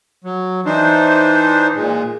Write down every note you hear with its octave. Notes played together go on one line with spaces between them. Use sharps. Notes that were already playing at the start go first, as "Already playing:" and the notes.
F#3
E3 D4 D#4 C5
A#2 G#3